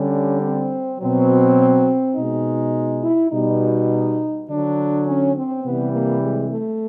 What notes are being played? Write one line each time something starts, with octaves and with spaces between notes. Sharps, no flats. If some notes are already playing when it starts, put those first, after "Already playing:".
Already playing: D3 G3 C#4
C4
B2 F#3 C4
B2 G#3 D#4
E4
B2 G3 D#4
D3 F#3 D4
C#4
C4
C3 E3 G3 B3
A#3
G#3
A3